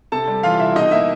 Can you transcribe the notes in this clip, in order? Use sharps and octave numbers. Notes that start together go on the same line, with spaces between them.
C3 A4 A5
G3
E3 F4 F5
C2 E4 E5
B2 D#4 D#5
A#3 E4 E5